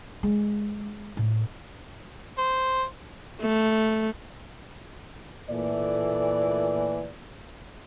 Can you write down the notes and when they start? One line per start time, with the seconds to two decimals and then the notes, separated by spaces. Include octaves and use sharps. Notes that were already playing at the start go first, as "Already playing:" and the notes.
0.23 G#3
1.17 A2
2.38 C5
3.41 A3
5.50 A#2 E3 A3 D5